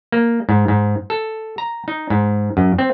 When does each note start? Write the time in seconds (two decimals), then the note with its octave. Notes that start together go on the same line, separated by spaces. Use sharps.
0.12 A#3
0.49 G#2
0.68 G#2
1.10 A4
1.58 A#5
1.88 D#4
2.10 G#2
2.57 F#2
2.78 C4